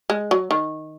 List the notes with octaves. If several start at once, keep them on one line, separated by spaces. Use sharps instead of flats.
G#3
F#3
D#3